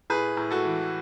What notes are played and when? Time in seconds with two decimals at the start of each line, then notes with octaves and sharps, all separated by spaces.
0.10 A2 G#4 B4
0.37 A2
0.51 F#4 A4
0.65 E3